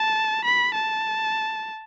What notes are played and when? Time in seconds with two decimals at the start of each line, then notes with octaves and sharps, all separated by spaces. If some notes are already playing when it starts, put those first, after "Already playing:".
Already playing: A5
0.45 B5
0.74 A5